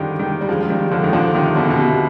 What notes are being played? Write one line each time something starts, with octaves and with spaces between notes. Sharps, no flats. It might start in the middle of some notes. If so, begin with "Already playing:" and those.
Already playing: D3 D#3 F3 G3
D#3 G3
G3
F3 G#3
F3
D#3 G3
D3 F3
D#3
D3 F3
C3 D#3
B2 D3
B2
C3